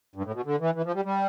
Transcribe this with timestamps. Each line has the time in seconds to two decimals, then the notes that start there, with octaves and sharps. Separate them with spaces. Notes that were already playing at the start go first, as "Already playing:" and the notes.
0.16 G2
0.25 A2
0.34 B2
0.46 D3
0.60 E3
0.75 E3
0.85 F3
0.95 G3
1.05 G3